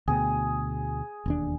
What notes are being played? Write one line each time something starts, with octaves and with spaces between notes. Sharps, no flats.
D2 B2 G#4
E1 D#2 D4